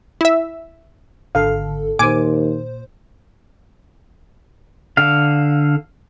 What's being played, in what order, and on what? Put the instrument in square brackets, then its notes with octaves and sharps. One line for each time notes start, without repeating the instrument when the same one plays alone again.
[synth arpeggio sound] E4 E5
[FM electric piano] G#1 D3 A4 [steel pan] F5
[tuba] D#2 [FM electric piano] A#2 C5 [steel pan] G#5 [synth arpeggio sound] D6
[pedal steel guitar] D3 F5